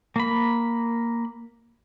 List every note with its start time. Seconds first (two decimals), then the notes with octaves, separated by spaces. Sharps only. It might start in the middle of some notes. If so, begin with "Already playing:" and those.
0.16 A#3 B5